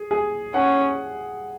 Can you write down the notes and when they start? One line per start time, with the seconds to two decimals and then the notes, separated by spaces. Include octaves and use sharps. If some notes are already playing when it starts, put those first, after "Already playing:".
Already playing: G#4
0.11 G#4
0.54 C#4 F#5